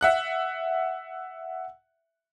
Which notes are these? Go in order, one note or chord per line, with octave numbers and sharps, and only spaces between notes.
E5 F#5 F#6